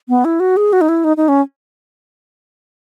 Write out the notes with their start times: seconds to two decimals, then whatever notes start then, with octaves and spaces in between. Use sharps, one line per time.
0.09 B3
0.25 E4
0.40 F#4
0.57 G#4
0.73 F#4
0.81 D#4
0.89 E4
1.04 D#4
1.17 D#4
1.28 C#4